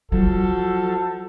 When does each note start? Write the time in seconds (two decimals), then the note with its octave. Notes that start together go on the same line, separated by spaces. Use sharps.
0.12 F3 F#3 F#4 A4